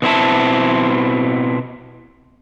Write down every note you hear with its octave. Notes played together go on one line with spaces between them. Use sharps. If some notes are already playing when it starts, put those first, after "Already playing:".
B2 C4 E4 A5